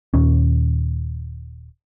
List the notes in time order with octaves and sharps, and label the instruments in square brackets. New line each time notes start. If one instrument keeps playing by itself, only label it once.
[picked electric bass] D#1 D#2 C#4